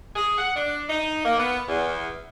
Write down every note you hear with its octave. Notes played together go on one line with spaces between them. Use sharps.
G#4
F#5
D4
D#4
A#3
B3
E2